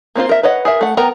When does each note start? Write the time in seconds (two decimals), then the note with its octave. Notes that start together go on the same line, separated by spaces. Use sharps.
0.15 A#3 C4 F4 C5
0.29 A#4 E5
0.43 B4 C#5 D#5 F#5
0.65 G#4 A#4 E5
0.81 A3 F#5
0.97 B3 A#4 F#5 G5 A#5